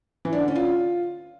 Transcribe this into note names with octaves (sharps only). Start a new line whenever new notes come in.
E3
D4
D3
C#4
F4